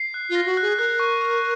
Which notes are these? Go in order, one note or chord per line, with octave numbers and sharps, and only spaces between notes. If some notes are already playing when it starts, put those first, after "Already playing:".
Already playing: C7
F#6
F4
A#6
F#4
G#4 F#6
A#4 F#6
C#6
C#6